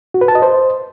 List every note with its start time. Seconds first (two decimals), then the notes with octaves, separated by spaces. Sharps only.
0.14 F#4
0.21 B4
0.28 A5
0.35 D#5
0.42 C5